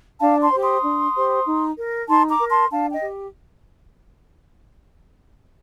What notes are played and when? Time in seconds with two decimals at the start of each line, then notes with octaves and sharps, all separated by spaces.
0.20 D4 F5 A5
0.41 A5 C6
0.52 G4 C5
0.62 C6 D#6
0.83 D4
1.15 G4 C5
1.46 D#4
1.77 A#4
2.08 D#4 A5 C6
2.29 A#5 D6
2.40 A#4
2.50 A5 C6
2.71 D4 F5 A5
2.91 D#5 G5
3.02 G4